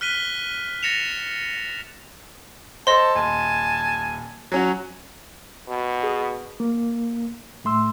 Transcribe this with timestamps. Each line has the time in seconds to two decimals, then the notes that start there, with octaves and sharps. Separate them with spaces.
0.01 F6 F#6 B6 D#7 G7
0.83 A6 A#6 C#7 E7 F7
2.87 A4 C5 D#5 A5 C6
3.15 D#1 G#5 A5
4.52 F#3 C#4 F#4
5.68 B2
6.03 G#4
6.60 A#3
7.64 A2 A3 C6 E6